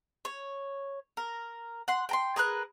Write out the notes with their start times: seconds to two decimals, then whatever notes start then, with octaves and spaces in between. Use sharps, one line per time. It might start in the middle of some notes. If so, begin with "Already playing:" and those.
0.25 C#5
1.17 A#4
1.88 F#5 C6
2.09 G5 A#5 C6
2.36 G#4 A#4 B4 F#6